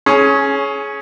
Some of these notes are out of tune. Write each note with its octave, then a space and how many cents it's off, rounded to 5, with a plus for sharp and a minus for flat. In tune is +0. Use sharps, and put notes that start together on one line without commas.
C#4 +0 G#4 +25